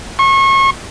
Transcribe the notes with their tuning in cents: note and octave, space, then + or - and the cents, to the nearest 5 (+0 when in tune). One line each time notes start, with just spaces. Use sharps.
C#6 -35